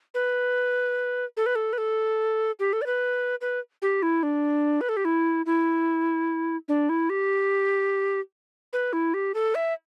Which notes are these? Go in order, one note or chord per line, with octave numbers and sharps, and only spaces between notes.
B4
A4
B4
A4
B4
A4
G4
A4
D5
B4
B4
G4
E4
D4
B4
A4
G4
E4
E4
D4
E4
G4
B4
E4
G4
A4
E5